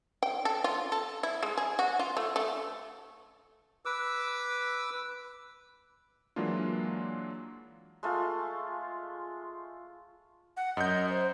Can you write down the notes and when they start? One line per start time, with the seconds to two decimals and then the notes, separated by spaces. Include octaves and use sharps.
0.23 G5
0.45 A4
0.64 F4
0.92 A4
1.23 E4
1.43 G#3
1.57 G#4
1.79 F#4
1.99 F4
2.17 A3
2.36 A3
3.85 B4 D6 E6
6.36 E3 F#3 G#3 A#3 D4 F4
8.03 G#3 A3 F4
10.57 F#5
10.77 F#2 D#5 G6
11.10 C5